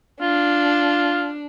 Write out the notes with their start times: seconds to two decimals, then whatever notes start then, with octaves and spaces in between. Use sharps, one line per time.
0.21 D4 F4